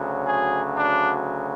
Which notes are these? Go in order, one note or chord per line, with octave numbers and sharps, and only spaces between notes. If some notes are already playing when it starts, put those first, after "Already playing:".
Already playing: D2 C#3 F#3
G#4
D4